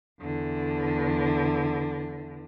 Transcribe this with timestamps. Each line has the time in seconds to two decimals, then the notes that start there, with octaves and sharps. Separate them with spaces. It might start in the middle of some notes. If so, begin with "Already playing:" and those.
0.21 E2 D3